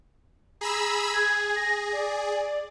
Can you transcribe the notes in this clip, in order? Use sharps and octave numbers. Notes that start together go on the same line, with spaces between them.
G#4 A#5 B5 E6
G#4 G#6
A#6
D5